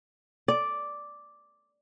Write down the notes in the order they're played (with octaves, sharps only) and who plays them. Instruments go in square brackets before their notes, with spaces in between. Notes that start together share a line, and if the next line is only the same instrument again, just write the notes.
[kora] D5